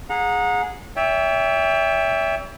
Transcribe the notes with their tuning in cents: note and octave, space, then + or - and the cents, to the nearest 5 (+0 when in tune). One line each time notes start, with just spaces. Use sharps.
G#4 +0 F#5 -30 A#5 +0
C#5 +45 E5 +0 G5 +25